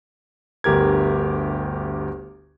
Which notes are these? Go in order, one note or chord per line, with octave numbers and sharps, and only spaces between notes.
G1 D2 G4 A#4 G#6